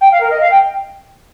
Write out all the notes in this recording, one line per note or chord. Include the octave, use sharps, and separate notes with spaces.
G5
F5
A#4
D#5
F5
G5